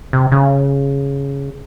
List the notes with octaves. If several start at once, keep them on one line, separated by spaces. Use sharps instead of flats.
C3
C#3